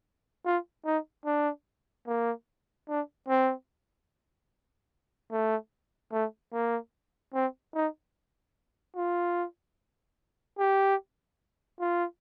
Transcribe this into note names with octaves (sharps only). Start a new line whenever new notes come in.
F4
D#4
D4
A#3
D4
C4
A3
A3
A#3
C4
D#4
F4
G4
F4